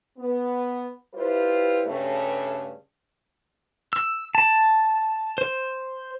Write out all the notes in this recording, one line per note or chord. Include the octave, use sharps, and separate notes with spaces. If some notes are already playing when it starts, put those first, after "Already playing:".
B3
G3 E4 F4 G4 B4 C5
G2 C#3 A3
E6
A5
C5